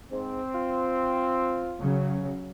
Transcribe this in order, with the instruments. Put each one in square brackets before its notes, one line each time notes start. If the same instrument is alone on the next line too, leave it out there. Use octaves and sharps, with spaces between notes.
[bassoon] G#2 [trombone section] C4
[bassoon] F4
[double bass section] C#3 F#3